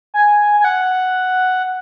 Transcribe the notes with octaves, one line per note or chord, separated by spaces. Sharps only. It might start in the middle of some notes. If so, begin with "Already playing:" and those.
G#5
G#5
F#5